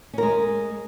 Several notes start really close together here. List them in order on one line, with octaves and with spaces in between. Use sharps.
C#4 A#4 G#3